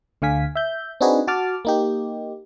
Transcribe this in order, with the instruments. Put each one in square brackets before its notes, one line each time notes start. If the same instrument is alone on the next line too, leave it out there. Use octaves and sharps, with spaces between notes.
[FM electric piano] D2 D3 F5 G#5 B6
E5 G6
C4 D4 D#4 F#4 G#4 B4
F#4 A5 D6 F6
A#3 D#4 G4